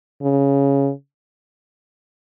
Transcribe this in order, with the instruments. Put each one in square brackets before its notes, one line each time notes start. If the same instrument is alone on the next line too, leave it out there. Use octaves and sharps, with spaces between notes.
[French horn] C#3